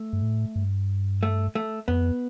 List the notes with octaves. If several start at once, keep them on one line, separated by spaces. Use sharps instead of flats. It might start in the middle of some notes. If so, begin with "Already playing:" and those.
Already playing: A3
G2
A2
G2
A3
A3
F2 B3